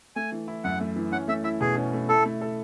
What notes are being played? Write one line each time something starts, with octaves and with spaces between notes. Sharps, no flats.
A3 G#5
E3
E4
F#2 F#5
A3
E3
C#4 F#5
A3 E5
E4 E5
B2 G#4
C#4
A3
E4 A4
A3
A4